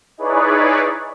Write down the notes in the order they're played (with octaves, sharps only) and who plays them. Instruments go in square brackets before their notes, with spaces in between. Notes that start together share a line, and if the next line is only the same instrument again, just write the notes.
[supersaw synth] D#4 E4 G#4 B4 C#5 D5